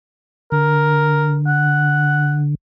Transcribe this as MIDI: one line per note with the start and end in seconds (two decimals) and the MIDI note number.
0.52 2.55 50
0.52 1.37 70
1.47 2.41 78